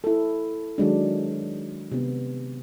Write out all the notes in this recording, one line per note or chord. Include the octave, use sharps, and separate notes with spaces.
E4 A4
D#3 F#3 G#3 D4
C3 B3